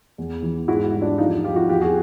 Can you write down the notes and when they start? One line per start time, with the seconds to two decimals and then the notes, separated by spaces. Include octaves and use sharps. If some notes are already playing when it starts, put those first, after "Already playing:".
0.18 E2
0.43 E3
0.68 G#2 E4 F#4
0.93 G3
1.01 D4 E4
1.18 F2 D#4 F4
1.44 F3 F4 G4
1.56 E4 F#4
1.69 E2 F4 G4
1.81 F#4 G#4